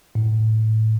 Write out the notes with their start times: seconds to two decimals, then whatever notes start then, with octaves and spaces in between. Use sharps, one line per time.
0.15 A2